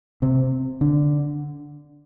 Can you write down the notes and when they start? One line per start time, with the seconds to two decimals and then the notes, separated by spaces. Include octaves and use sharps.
0.22 C3 C4
0.81 D3 D4